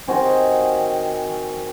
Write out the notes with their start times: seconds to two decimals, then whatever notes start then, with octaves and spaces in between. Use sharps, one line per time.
0.07 D#3 C4 F#4 G#4